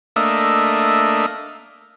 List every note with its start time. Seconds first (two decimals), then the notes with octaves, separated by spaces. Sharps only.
0.16 A3 A#3 D4 D#5 E5